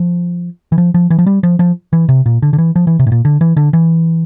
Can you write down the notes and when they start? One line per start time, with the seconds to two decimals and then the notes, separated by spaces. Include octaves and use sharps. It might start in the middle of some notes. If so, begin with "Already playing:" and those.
Already playing: F3
0.72 E3
0.78 F3
0.94 F3
1.10 E3
1.19 F3
1.26 G3
1.43 F3
1.59 F3
1.93 E3
2.09 C3
2.26 A#2
2.42 D3
2.53 D3
2.58 E3
2.76 F3
2.87 E3
2.99 C3
3.07 A2
3.12 A#2
3.25 D3
3.41 E3
3.57 D3
3.73 E3